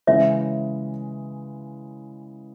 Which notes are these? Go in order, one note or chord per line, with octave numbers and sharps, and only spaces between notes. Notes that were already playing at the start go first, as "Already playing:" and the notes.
C#3 E3 G#3 C#5 E5